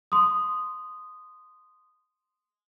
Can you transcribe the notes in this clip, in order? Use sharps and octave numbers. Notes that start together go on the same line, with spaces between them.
C6 D#6